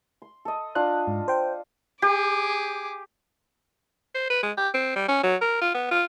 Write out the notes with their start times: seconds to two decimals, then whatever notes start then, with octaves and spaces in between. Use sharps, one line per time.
0.22 C6
0.45 A4 D#5
0.75 D4 F4 D#5 F#6
1.08 G#2
1.28 C5 G5
2.02 G4 G#4 D6
4.15 C5
4.30 B4
4.43 G#3
4.57 G4
4.74 C4
4.96 G3
5.08 C#4
5.24 F#3
5.41 A#4
5.61 F4
5.75 B3
5.91 F4